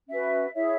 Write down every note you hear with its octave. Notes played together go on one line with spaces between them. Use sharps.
C#4 F#4 B4 E5
E4 G#4 C#5 E5